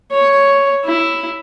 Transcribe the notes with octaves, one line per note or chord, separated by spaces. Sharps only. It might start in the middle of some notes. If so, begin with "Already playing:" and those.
C#5
E4